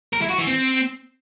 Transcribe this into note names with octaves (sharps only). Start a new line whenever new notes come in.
A#4
E4
F#4
E3
C4